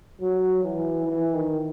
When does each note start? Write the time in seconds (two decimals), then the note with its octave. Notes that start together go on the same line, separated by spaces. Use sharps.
0.21 F#3
0.64 E3
1.06 E3
1.34 D#3